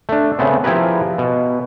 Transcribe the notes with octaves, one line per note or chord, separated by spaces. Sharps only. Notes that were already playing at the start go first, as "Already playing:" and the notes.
A3 D4
C#3 A3 B3 C4
F3 E4 G4 G#4 A#4 B4
B2